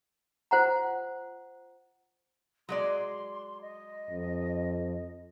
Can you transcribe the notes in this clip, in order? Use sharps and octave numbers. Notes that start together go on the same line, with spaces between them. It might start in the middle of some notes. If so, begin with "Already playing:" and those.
F4 C5 F#5 A#5
F#3 G#3 D5 C6
D#5
F2